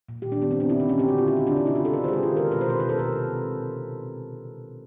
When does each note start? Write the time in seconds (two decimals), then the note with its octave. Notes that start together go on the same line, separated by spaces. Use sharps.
0.09 A#2
0.22 D#3 G4
0.32 D4
0.37 D#3
0.42 B3
0.51 C#3 C4
0.60 D4
0.66 C#3 E4
0.79 D3 D#4
0.89 C#4
0.94 D3
0.99 G4
1.08 D3 F#4
1.18 F4
1.23 D3
1.28 E4
1.37 C#3 D#4
1.47 D4
1.51 C#3
1.56 D#4
1.65 C#3 E4
1.75 F4
1.80 C#3 A4
1.93 D#3 B4
2.04 C5
2.08 G#3 G#4
2.13 G4
2.23 D#3 F4
2.36 D#3 A#4
2.51 B2 B4
2.61 C5
2.65 B2 B4
2.80 B2 A#4
2.89 A4
2.94 B2
2.99 A#4
3.08 C3